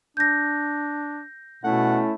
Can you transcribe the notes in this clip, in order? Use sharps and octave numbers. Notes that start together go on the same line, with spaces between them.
D4 G6 A#6
B2 A3 C#4 E4 F#5